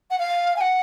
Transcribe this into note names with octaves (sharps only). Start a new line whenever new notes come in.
F#5
F5
G#5
F#5